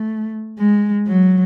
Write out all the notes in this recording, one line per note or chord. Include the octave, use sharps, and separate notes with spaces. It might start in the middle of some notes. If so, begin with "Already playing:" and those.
Already playing: A3
G#3
F#3